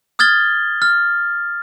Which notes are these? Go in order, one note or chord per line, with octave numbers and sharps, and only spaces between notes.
D#6 F6 G#6 A6 G7
F6